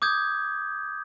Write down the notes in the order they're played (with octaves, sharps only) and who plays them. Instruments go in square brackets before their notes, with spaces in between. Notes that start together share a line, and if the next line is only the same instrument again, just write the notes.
[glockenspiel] D6 D#6 G6 G#6